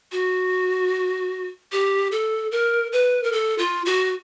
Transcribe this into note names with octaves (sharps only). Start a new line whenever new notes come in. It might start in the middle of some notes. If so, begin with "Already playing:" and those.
F#4
G4
A4
A#4
B4
A#4
A4
F4
F#4